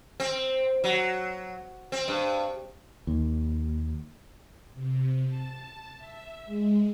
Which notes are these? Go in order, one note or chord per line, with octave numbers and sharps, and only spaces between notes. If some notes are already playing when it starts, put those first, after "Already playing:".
C4
F#3
C4
G2
D#2
C3
A5
E5
G#3